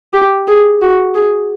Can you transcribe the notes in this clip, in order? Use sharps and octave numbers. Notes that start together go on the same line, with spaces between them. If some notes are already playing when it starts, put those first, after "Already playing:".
G4
G#4
F#4
G#4